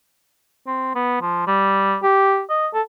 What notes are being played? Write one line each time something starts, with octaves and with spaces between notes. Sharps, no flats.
C4
B3
F3
G3
G4
D#5
A4